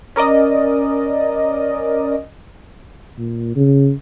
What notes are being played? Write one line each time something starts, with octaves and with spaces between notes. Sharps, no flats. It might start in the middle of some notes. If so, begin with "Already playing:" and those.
C#4 A#4 D5 D#5
A#2
C#3